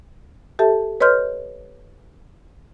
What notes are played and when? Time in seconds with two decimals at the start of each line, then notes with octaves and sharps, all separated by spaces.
0.59 G4 A4 E5 A5
1.00 B4 C#5 D#5 C6 F6 G6